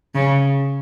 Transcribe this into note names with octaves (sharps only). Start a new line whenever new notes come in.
C#3